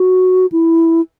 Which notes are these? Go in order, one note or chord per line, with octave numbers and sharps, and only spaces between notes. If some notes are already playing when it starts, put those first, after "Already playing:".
Already playing: F#4
E4